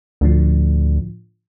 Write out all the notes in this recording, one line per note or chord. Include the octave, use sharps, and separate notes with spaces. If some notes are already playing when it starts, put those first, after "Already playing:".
D2 A2 D3 F3